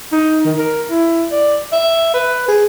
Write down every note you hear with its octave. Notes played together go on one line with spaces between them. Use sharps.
D#4
D#3
A#4
E4
D5
E5
B4
G#4